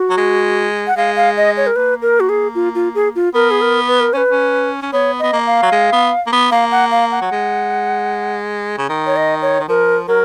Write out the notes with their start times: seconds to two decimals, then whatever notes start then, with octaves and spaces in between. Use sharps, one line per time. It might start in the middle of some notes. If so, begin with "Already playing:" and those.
Already playing: F#4
0.10 F#3
0.17 G#3
0.87 F#5
0.97 G#3 F5
1.16 F5
1.37 D#5
1.57 C#5
1.67 A#4
1.76 A#3 B4
2.02 A#4
2.20 F#4
2.29 G#4
2.55 F4
2.75 F4
2.95 G#4
3.15 F4
3.34 B3 A#4
3.51 G#4
3.61 A#4
3.88 B4
4.00 A#4
4.13 C#4 B4 C#5
4.31 C#4
4.82 C#4
4.93 B3 C#5
5.20 B3 D#5
5.33 A#3
5.46 F5
5.62 F#3
5.72 G#3
5.92 B3
6.27 A#3
6.32 B3
6.51 A#3 F5
6.71 F#5
6.91 F5
7.12 F#5
7.21 F#3
7.31 G#3
8.78 C#3
8.89 D#3
9.06 C#5
9.16 D#5
9.42 C#5
9.60 D#3
9.68 F3 A#4
10.08 F#3 A#4